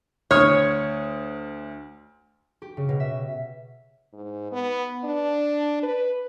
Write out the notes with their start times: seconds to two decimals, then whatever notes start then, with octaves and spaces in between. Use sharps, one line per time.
0.31 D2 C#5 D#6 F6
2.62 G4
2.77 C#3
2.89 B2
3.00 E5
4.13 G#2
4.52 B3
5.04 D4
5.83 B4